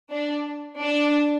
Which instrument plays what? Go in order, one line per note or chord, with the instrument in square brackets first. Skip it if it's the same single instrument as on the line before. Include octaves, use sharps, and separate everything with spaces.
[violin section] D4
D4